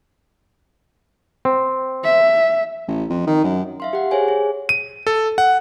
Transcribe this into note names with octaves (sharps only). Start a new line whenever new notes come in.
C4
E5
A1
F2
D#3
F#2
E5 F5 C6
G4 F#5
G#4 C5 C#5 G#5
G#4
D#7
A4
F#5